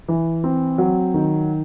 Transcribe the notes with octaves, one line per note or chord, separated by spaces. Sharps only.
E3
C4
F#3
D#3